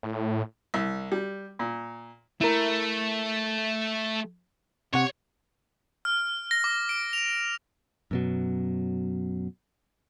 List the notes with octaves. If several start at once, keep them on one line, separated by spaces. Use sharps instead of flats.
A2
C2
G3
A#2
A3 E4 A#4
C3 C#5 F#5
F6
A#6
D6
D7
F7
F#2 B2 F#3